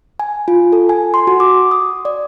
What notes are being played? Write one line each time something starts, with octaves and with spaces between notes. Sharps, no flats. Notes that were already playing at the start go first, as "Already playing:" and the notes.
G#5
F4
A4
G#5
C6
F#4
D6
D#6
D5